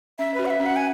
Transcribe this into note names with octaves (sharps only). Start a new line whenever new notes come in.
C#4 E5
F#4 B4
F#5
E5
C#4
F#5
G#5